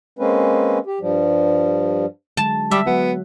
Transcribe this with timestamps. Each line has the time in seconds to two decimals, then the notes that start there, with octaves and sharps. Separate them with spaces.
0.19 G#3 A#3 C4 C#4 B4
0.86 G4
1.01 G2 F3 G3
2.37 D3 F#3 G#3 A5
2.71 G3 E5
2.87 F#3 B3 F#4